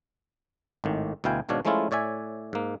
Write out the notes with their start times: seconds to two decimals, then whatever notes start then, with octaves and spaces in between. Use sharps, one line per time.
0.84 G#1 A2 D#3
1.24 D2 B2 E4 F5 G5 G#5
1.49 G#1 G#2 B2 D4 C#5 F5
1.65 F3 G#3 A3 C#4 E4 F4
1.91 A2 C#5 D5 E5 G#5
2.53 G#2 A#3